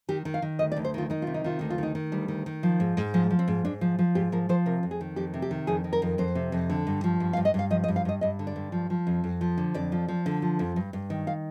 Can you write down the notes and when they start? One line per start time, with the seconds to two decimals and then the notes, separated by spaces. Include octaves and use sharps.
0.09 D#3 G4
0.25 D#3
0.34 F5
0.42 D#3
0.59 D2 D#5
0.72 D5
0.76 D2
0.85 C5
0.94 D#3 F4
1.10 D#3 D#4
1.22 C3 F4
1.34 D#4
1.44 D#3 F4
1.59 D2 D#4
1.70 F4
1.78 D#3 D#4
1.95 D#3
2.12 D2 G3
2.28 D#3
2.46 D#3
2.63 F3
2.80 G#2
2.97 G#2
3.14 F3 G#3
3.31 F3
3.39 C4
3.48 G#2
3.65 G#2 D4
3.81 F3
3.99 F3
4.15 G#2 G4
4.32 F3 A#4
4.49 F3 C5
4.66 C3 A#4
4.83 F2
4.91 G#4
5.01 D#3
5.16 F2 G4
5.34 C3
5.42 G4
5.51 D#3
5.67 F2 G#4
5.84 D#3
5.93 A#4
6.02 F2
6.18 F2 C5
6.35 C3
6.52 F2
6.70 D3
6.87 G2
7.04 F3
7.20 G2
7.33 F5
7.37 G2
7.45 D#5
7.54 G2 F5
7.70 F3 D#5
7.84 D#5
7.88 G2
7.96 F5
8.05 G2 D#5
8.21 G2 D#5
8.39 D3
8.47 D5
8.56 G2
8.72 F3
8.90 F3
9.07 F2
9.24 F2
9.41 F3
9.58 D3
9.74 F2 D5
9.92 F3
10.08 F3
10.26 D3
10.42 F3
10.59 F2
10.76 G2
10.93 G2
11.10 D#3
11.27 F5